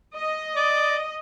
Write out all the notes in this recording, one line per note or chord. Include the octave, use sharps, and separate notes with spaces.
D#5
D5